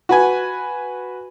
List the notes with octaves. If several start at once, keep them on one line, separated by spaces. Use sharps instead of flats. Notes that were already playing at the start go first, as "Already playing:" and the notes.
F#4 B4 G#5